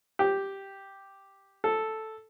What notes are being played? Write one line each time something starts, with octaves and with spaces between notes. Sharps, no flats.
G4
A4